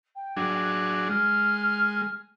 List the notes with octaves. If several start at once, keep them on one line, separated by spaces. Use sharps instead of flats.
G5
F#3 D4 G#4
F#6
G#3 F6